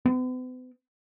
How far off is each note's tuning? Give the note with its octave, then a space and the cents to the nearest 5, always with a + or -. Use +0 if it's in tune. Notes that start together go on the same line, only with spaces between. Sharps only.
B3 +45